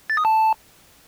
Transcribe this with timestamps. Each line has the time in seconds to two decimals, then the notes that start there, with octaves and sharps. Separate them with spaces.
0.10 A6
0.17 D#6
0.25 A5